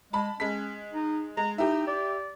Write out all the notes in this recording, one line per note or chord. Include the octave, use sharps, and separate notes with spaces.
G#3 A5 B5
G#3 C#4 B6
D#4
G#3 A#5
D#4 E4 G4
D5